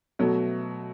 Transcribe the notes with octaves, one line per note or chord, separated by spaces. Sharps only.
B2 F#3 A3